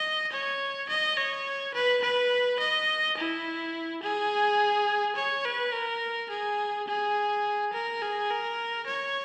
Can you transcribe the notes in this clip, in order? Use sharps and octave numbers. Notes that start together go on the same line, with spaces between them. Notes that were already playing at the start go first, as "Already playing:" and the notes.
Already playing: D#5
C#5
D#5
C#5
B4
B4
D#5
E4
G#4
C#5
B4
A#4
G#4
G#4
A#4
G#4
A#4
C#5